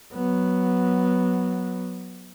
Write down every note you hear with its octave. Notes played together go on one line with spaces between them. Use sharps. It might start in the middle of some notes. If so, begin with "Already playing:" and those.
F#3 B3